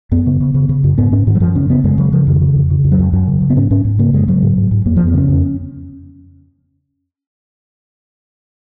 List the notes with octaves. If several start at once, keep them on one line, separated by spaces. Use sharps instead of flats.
F#2 B3
C#3
C#3
C#3
C#3
F#2
G#2 B3
G#2 C#4
G#2 D#3
F#3
F#2 F3
C#3 C#4
C#3 B3
F#2 G#3
C#3 F#3
C#3 F3
F2 D#3
C#3
F2
C#3
F2
F#3
F2
F#2 F#3
C#3
C#3
B3
G#2 C#4
G#2 C#4
G#2
C#3 A#3
F#2 G#3
C#3 F#3
G#2
G#2
G#2
F2 A#3
F3
F2
B3
C#3 C#4
F2